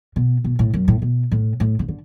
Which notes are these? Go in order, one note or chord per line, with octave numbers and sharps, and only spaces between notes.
B2
B2
A2
F#2
A2
B2
A2
A2
C#3
D3